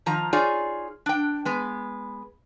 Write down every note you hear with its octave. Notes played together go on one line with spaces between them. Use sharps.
D#3 F3 A#5
D#4 F4 G#4 C#5 D5
D4 G5
G#3 B3